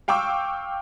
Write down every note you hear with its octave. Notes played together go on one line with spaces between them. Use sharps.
F5 G5 C#6 D6 E6